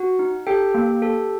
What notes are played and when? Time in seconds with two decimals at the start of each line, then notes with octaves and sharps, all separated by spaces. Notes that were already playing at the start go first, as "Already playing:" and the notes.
Already playing: F#4 F#5
0.19 D#4
0.47 G4 A4 G5
0.74 A#3
1.02 A4